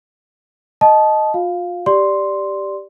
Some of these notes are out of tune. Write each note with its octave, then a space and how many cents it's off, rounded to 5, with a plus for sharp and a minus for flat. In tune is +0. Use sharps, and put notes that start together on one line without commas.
D#5 +0 A5 -20 D#6 +0
F4 +35 F5 +0
G4 +0 D5 +0 C6 +0